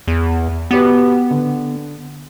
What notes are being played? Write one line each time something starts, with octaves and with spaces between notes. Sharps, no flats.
E2
B3 F#4 G4 B4
D3